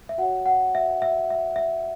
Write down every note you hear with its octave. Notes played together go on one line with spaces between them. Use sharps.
E5
F#4 C#5 F#5
F#5
E5
E5
E5
E5